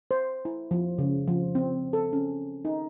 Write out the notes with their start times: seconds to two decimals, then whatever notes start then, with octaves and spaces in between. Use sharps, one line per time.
0.11 C5
0.45 E4
0.71 F3
0.98 C#3
1.27 F3
1.55 C4
1.93 A4
2.13 C#4
2.65 D#4